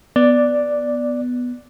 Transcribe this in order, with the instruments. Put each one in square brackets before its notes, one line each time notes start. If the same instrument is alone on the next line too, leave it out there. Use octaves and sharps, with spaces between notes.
[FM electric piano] B3 [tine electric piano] D5